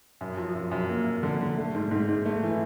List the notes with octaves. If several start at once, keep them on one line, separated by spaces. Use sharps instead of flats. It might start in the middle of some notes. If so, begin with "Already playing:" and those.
F#2
F3
F#2
F#2
A#3
F#2
D3
D3
A3
G#2
G#2
G#2
A3
E3